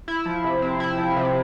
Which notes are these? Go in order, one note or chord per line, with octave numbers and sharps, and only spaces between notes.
E4
F3
C3
C4
E4
F3
C3